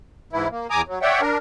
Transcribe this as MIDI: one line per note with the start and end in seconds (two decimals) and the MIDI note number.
0.33 0.48 44
0.33 0.48 52
0.33 0.48 64
0.51 0.67 58
0.70 0.82 40
0.70 0.82 80
0.70 0.82 82
0.70 0.82 86
0.70 0.82 87
0.88 0.99 54
1.02 1.21 73
1.02 1.21 74
1.02 1.21 76
1.02 1.21 78
1.02 1.21 79
1.21 1.38 62
1.21 1.38 70